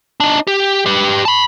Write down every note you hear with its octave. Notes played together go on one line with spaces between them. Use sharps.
D4 D#4
G4
G4 B4
A5 B5